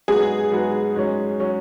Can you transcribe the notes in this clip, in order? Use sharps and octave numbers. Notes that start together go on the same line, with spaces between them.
G#2 F#3 B3 F#4 G#4 B4
G#2 F#3 B3 F#4 B4
G#2 F#3 C#4
F#3 C#4